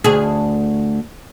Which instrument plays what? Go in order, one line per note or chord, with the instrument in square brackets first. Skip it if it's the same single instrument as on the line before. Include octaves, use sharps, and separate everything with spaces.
[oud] D2 G#4